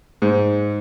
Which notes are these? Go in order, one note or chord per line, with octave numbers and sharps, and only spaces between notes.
G#2